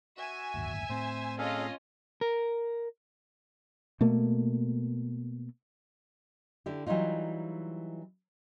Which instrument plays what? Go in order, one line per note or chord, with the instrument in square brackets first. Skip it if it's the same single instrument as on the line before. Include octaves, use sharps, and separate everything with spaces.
[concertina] F#4 [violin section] E5 G#5
[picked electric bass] D1 G1 D#2
[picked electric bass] A2 C4 [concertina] C5
[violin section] C#4 F4 D#5 [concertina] G#4 A4 F5
[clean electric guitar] A#4
[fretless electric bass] B2 A3 A#3
[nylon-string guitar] D3 E4 G4
E3 F#3 G3 D#4 F4